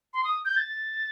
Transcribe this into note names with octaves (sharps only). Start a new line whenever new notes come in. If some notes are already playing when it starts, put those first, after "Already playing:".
C6
D#6
G6
A6